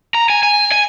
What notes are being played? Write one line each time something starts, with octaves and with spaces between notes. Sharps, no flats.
A#5
G#5
G#5
G#5